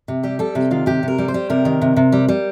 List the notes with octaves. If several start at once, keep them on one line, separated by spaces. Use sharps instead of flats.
C3
G3 G4
G3 A4
C3 G4
D#3 F4
C3 G4
C3 A#4
G3
C5
G3
C3 A#4
D#3
C3
C3
G3
G3